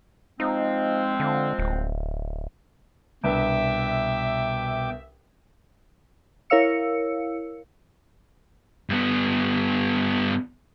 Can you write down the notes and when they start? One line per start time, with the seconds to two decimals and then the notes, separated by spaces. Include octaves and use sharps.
0.40 F3 G#3 C4 D#4
1.20 D3
1.59 D1
3.24 C2 B2 D4 B4 E5 G5 D6
6.50 E4 A#4 C#5 F5 E6 C#7
8.89 G2 B3